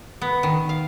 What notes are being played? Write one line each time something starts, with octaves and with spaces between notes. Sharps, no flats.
B3
D#3
F5